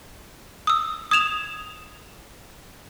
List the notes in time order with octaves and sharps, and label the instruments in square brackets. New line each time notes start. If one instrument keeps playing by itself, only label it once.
[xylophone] D#6 E6
D#6 G#6 E7 F7